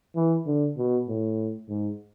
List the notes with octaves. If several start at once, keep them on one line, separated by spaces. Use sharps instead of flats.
E3
D3
B2
A2
G#2